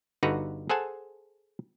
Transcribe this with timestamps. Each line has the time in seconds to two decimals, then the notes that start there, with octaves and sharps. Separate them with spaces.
0.23 G1 D3 D#4 F#4 B4 A#5
0.70 G#4 A4 C5 F#5 G#5 A5